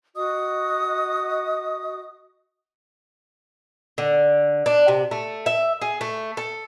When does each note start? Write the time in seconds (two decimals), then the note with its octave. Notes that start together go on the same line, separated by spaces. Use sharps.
0.15 F#4 D#5 D#6
3.98 D3
4.66 D4
4.88 C3
5.11 A3
5.46 E5
5.82 G#4
6.01 A3
6.37 A4